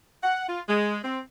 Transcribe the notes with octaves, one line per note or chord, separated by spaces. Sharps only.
F#5
F4
G#3
C4